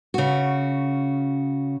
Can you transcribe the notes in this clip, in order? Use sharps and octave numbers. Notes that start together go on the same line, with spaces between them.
C#3 F#4